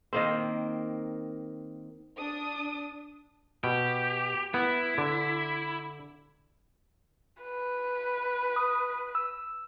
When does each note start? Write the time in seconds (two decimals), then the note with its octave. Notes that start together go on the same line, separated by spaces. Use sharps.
0.13 D#3 A#3 C4
2.16 D4 D#6
3.64 B2 G4
4.54 B3 E4
4.98 D3
7.42 B4
8.56 D#6
9.15 E6